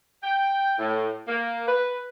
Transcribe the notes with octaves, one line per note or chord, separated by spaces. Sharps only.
G5
A2
A#3
B4